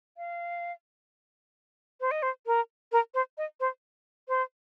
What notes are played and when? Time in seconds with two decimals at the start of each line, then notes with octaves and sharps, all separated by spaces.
0.17 F5
2.01 C5
2.11 D#5
2.23 C5
2.46 A#4
2.92 A#4
3.14 C5
3.38 D#5
3.60 C5
4.28 C5